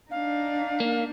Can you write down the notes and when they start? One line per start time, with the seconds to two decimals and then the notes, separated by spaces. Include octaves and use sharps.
0.11 D4 D#4 F5
0.80 A#3